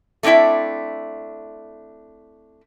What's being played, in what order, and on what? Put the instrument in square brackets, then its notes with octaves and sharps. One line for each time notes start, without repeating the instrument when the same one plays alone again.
[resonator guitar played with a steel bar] A3 C4 D4 E4 E5